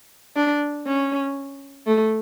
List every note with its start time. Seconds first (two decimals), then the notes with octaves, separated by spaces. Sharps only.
0.36 D4
0.86 C#4
1.87 A3